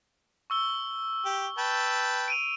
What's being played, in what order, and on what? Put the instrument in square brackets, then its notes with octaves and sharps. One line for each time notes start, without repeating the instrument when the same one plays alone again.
[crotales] C#6 E6 G7
[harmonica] G4
B4 G5 A5
[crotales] D7 D#7 F7